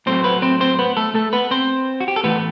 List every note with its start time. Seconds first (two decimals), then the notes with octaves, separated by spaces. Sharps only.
0.06 A2 F#3 A3 C4 C5
0.24 B3 B4
0.42 C4 C5
0.60 C4 C5
0.79 B3 B4
0.97 A3 A4
1.15 A3 A4
1.33 B3 B4
1.51 C4 C5
2.00 F#4
2.08 G4
2.16 A4
2.24 A2 E3 A3 B3 B4